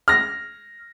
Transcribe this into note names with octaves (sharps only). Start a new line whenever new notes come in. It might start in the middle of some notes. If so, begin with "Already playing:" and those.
F6 A#6